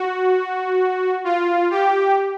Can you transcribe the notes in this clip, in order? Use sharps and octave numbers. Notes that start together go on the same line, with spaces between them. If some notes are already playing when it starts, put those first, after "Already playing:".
Already playing: F#4
F4
G4